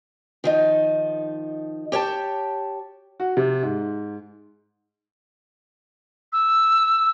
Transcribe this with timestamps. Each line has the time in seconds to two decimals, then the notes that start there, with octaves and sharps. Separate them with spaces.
0.44 D#3 F3 D#4
1.92 G4 C#5 G5 A5
3.20 F#4
3.37 C3
3.63 G#2
6.33 E6